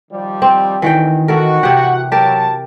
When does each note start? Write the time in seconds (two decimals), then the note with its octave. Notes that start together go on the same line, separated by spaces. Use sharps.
0.11 D#3 F3 G3
0.42 C4
0.82 D2 D#3 E3 F#4 G5
1.28 E4 F#4 A4 A#4
1.63 C3 G4 F#5
2.12 B2 F#3 G4 A#4 A5